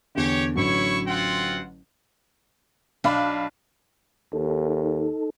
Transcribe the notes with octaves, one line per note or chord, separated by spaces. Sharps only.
E2 D3 G4 C#5
A1 D3 F#3 E4 C#5 C#6
C4 F4 F#5
B1 D4 F5 B5
D#2 D#4 A4